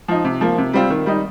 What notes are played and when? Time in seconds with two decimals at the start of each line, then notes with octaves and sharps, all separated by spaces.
0.08 F3 D#4
0.25 C3
0.41 F3 A#3
0.58 C3
0.73 G3 C4 F4
0.90 D#3
1.06 G3 D#4